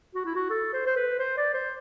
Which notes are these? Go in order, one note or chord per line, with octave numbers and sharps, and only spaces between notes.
F#4
E4
F#4
A4
C5
C5
B4
C5
D5
C5